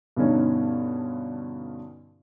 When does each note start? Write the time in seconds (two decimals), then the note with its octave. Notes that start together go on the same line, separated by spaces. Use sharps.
0.17 G2 B2 D3 C#4 D#4